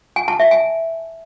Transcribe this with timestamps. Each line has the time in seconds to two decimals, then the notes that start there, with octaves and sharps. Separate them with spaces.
0.16 G#5
0.28 A5
0.40 E5
0.51 G#5